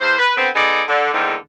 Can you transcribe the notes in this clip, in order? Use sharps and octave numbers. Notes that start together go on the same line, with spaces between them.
E2 E3 C5
B4
D3 B3 C4
B3 D#4 G#4 A4 D5
D3
E2 G#2 D3 D#3 A#3